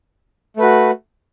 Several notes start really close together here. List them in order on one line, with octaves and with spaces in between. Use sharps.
A3 B4 F#4